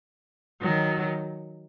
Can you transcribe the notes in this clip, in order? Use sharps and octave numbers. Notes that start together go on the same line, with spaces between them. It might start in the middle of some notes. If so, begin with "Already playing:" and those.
D#3 F#3